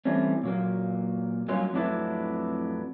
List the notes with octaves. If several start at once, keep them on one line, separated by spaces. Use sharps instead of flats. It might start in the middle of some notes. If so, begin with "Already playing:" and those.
E3 G3 A3 C4 C#4
A#2 F#3 A#3
G2 F#3 A#3 C#4 F4
F2 A2 F#3 D4 E4 B4